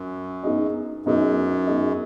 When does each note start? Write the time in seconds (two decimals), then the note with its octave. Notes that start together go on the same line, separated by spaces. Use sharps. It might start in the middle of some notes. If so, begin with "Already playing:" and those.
Already playing: F#2
0.44 B3 D#4 G#4 D#5
1.06 F#2 B3 D#4 G#4 D#5
1.67 B3 D#4 G#4 D#5